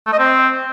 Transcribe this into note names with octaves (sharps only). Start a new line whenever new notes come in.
A3
D#5
C4